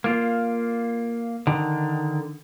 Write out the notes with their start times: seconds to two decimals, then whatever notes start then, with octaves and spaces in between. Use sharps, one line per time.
0.04 A#3 F4
1.47 D3 D#3